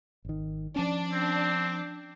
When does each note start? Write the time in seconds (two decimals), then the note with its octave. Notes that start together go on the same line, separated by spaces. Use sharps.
0.25 G#1 D#3
0.76 F3 C#4 D4
1.13 C4